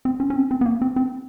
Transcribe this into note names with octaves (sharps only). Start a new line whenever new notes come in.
C4
C#4
C#4
C4
C4
B3
A#3
C4
C4